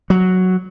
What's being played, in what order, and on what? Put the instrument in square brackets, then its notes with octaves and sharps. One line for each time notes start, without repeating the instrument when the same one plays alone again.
[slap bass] F#3